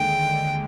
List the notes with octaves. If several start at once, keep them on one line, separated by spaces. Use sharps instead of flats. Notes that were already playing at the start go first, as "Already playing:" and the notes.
Already playing: D#2 D3 G#3 G5